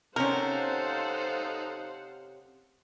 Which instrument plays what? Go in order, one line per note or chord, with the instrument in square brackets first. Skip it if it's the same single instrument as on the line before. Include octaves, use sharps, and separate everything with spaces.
[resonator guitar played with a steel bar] C3 C#4 [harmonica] D#4 A4 [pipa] A#4 [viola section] C5 F5 F#5